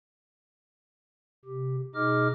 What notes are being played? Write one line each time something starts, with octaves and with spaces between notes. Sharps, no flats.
C3 G4
B2 D#4 G#4 D#5 D6 F6